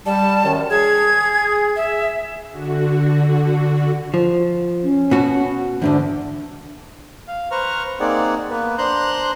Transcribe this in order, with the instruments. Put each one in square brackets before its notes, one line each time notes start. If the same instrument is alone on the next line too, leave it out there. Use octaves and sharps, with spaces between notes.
[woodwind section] G3 [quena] A5
[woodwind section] F#2 D#3
[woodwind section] G#4 [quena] G#6
[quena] E5
[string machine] D3 F#4
[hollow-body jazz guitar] F3
[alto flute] C#4
[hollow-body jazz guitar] B2 F#4
[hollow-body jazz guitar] E2 G#2 D3 [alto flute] D4
[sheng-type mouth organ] F5
B4 C5 A#5 C#6 F6
A#3 C4 D#4 G#4 D5 F#5
A#3 B3 B4
D4 C5 A#5 C6 F#6 G6